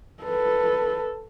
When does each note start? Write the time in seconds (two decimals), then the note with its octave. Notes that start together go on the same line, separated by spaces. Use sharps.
0.23 A4 B4